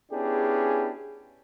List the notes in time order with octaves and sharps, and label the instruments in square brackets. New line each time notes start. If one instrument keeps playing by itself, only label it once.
[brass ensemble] B3 C#4 D4 E4 G4 G#4